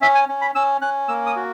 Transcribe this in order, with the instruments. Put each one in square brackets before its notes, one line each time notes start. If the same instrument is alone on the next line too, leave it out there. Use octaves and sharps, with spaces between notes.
[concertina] C#4 E5
G#5
C#4
B5
C#4 E6
C#4 F#6
A#3 E6
D#6
F#4